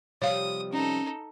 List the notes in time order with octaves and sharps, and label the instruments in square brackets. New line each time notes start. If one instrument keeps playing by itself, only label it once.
[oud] C3 F3 G3 [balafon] C#5 F5 [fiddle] D#6
[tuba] C#4 [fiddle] D#4 A4